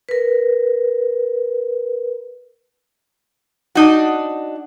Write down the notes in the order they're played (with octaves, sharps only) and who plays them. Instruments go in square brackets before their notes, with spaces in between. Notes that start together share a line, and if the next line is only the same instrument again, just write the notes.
[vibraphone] A#4 B4
[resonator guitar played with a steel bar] D4 D#4 F#4